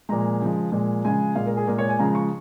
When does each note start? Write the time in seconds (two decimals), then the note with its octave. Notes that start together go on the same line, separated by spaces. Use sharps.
0.09 A#2 F3 G#3 A#5
0.41 C#3 F3 G#3
0.72 A#2 F3 G#3
1.05 C#3 F3 G#3 G#5
1.36 A#2 G#3 F5
1.46 A#4
1.57 G#4
1.67 A#2 G#3 A#4
1.79 C#5
1.89 G#5
1.99 C#3 F3 G#3 A#5
2.15 C#6